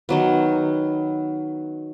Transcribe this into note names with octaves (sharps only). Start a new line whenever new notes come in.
D#3 F#3 B3